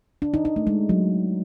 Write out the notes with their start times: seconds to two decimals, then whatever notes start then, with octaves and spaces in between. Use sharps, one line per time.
0.22 D4
0.34 D#4
0.45 D#4
0.56 A3
0.67 G#3
0.89 F#3